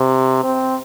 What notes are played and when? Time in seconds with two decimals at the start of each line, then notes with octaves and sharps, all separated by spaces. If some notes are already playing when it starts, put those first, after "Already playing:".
Already playing: C3
0.44 C4